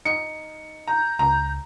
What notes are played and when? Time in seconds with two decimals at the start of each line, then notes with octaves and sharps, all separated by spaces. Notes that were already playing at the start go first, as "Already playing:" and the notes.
0.05 D#4 C#7
0.87 A#5 G6
1.19 C#2 A#5